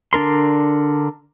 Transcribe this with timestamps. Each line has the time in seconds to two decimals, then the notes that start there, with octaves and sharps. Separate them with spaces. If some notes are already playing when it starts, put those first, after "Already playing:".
0.13 D3 D4 A#4 C6